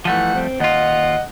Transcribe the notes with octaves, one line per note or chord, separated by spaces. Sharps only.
E3 F3 G3 A3 F#5
C4
D#2 F4 D#5 F#5